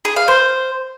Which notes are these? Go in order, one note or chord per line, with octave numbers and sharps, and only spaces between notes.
G#4
F5
C5